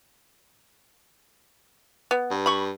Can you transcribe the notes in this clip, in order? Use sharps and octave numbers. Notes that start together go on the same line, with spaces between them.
B3
G2
B5 C#6